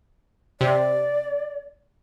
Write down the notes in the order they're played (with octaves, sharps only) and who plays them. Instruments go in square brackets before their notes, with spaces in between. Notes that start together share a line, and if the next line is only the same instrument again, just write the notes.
[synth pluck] C3 [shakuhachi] D5